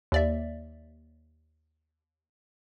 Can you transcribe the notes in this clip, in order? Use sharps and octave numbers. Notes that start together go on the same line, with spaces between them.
D#2 D5 E5